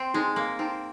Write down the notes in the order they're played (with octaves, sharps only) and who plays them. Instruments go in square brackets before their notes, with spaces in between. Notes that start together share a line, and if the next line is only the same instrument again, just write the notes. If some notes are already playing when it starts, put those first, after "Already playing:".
Already playing: [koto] C4
[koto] G#3 [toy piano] D#4
[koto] A#3
[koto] C4 [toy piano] D#4